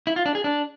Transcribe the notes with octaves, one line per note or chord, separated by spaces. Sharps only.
E4
F4
D4
G#4
D4